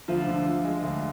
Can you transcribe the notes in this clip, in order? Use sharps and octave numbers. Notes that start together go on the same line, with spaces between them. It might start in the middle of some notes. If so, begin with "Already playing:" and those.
D2 F3 F4
D3
F3
G#3
D2